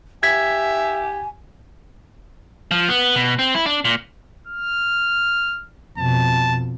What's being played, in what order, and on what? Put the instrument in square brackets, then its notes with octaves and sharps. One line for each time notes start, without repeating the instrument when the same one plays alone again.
[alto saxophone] G4 [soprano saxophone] E5 [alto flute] G#5 [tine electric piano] G#6 B6
[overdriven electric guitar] F3
B3
B2
C4
E4
D4
A#2
[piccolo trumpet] F6
[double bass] F2 B2 [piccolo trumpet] A5